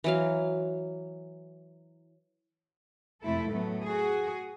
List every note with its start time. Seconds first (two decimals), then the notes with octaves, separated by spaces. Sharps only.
0.04 E3 F#3 F5
3.22 F2 C3 A3 E4 A4
3.51 A2 F#3 A3 B3
3.82 F#4 G#4